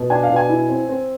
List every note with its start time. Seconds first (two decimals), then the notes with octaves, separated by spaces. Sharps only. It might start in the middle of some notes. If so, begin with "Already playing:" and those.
Already playing: B2
0.10 D4 G#5
0.23 F5
0.29 B2
0.36 G#5
0.49 E4
0.69 C4
0.89 C4